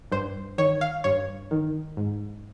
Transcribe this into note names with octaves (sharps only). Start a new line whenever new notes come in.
G2 C5
D#3 C#5
F5
G2 C#5
D#3
G#2